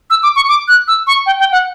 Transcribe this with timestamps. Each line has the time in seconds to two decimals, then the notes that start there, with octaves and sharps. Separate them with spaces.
0.10 E6
0.23 D6
0.36 C#6
0.49 D6
0.68 F#6
0.88 E6
1.07 C#6
1.26 G5
1.40 G5
1.52 F#5